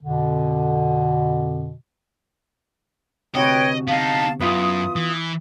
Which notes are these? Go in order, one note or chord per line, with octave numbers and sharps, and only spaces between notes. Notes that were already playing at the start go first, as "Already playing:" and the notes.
F2 B2 D3
D2 C3 F#4 B4 C#5 D#5 G5
B3 D#4 F5 A5
F#2 B3 E4 F4 D#6
E3